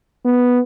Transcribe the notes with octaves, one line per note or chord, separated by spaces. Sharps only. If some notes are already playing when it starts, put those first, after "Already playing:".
B3